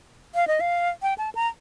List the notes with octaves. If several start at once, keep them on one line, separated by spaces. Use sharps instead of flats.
F5
D#5
F5
G5
A5
A#5